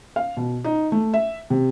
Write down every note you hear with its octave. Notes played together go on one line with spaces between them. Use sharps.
F5
B2
D#4
A3
E5
C3